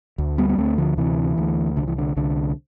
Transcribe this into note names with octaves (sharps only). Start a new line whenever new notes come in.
D2
G3 B3
B3
D2 A3 C4
D3 F3
C3 E3
D2
C2 D3
E3
D3
C2 D3